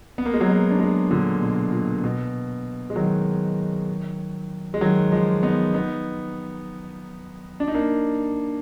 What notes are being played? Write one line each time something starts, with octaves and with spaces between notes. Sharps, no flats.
B3
A#3
G#3
F#3 A#3
G#3 B3
D4
G#3 B3
A#2 D3
B2
A#2
B2
G#3
D#3 F#3
G#3
D#3 F#3
F3 G#3
B3 D#4
B3 D#4
D4
D#4
A#3 D4